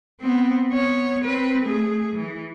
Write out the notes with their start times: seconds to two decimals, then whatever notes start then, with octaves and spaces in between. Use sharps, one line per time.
0.21 B3 C4
0.70 B3 C#5
1.24 C4 B4
1.62 A3 G#4
2.16 E3